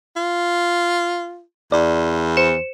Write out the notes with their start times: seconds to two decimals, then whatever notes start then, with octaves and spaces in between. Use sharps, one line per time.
0.16 F4
1.72 E2 D5
2.37 C5 C#7 E7